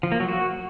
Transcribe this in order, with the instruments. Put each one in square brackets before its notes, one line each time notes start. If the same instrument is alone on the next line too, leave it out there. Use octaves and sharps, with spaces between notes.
[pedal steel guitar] F3
A#3
F#3
F#4